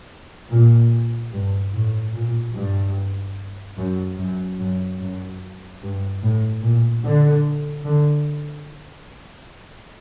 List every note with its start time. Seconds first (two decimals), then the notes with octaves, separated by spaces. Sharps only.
0.50 A#2
1.32 G2
1.73 A2
2.13 A#2
2.55 G2
3.77 F#2
4.18 F#2
4.59 F#2
4.99 F#2
5.82 G2
6.23 A2
6.63 A#2
7.04 D3
7.85 D3